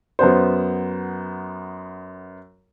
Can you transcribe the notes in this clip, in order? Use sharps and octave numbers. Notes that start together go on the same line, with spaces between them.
F#2 B3 C5